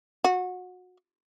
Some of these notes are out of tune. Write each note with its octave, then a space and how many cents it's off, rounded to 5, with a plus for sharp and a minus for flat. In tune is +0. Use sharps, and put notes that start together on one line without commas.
F#4 -25